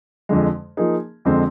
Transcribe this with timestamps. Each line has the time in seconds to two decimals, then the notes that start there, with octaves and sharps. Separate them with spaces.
0.29 F2 D3 G#3
0.77 F3 A#3 D#4 G#4
1.25 F2 D3 G#3 C4